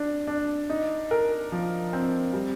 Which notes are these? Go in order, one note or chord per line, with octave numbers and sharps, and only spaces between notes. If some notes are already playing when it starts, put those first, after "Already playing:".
Already playing: D4
D4
D#4
A#4
F3
C4
G3